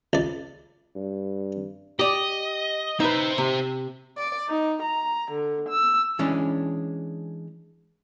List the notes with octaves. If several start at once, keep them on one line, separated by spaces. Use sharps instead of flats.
C#2 D5
G2
G4 D5 D#5
C4 D#4 B4 E5
C3
D5
D#4
A#5
D3
E6
E3 G#3 C#4 D4